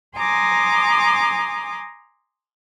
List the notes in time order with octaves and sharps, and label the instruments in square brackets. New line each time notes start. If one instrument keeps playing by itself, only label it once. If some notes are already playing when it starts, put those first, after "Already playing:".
[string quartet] G#5 A#5 C6 D6 D#6